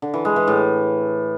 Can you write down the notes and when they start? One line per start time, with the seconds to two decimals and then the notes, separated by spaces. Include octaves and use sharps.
0.02 D3
0.14 E3
0.25 G#3
0.36 E3
0.48 A2